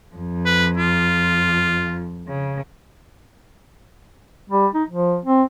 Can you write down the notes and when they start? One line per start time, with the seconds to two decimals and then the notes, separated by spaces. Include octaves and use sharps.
0.15 F2
0.46 B4
0.78 F4
2.28 C#3
4.50 G3
4.75 D#4
4.89 F3
5.25 C4